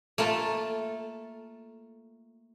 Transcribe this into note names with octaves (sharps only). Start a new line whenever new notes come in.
A3 A#3 F4 A4